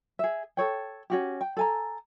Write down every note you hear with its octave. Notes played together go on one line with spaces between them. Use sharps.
G#4 E5
A4 C#5 G5
C#4 F#4 G4
G5
A4 G#5 A#5